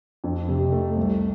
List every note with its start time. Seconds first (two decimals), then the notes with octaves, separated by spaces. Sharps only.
0.24 F2
0.49 C3
0.72 A3
0.97 C2